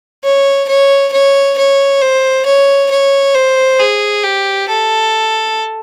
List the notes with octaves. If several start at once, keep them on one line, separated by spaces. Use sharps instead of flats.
C#5
C#5
C#5
C#5
C5
C#5
C#5
C5
G#4
G4
A4